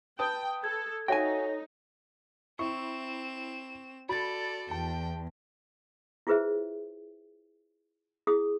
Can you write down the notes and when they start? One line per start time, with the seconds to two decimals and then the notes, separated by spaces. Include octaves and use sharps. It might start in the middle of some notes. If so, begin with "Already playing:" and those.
0.19 B4 G5 A5 D#6
0.64 A4 G#6
1.08 D#4 F#4 A4 C#5 E5 G5 G#5 A#6
2.59 C4 E4 C#6 E7
4.09 F#4 A4 D5 B5 A6
4.71 E2 G5 A5
6.27 E4 F4 G#4 B4 C5 E5
8.27 E4 G#4 D#6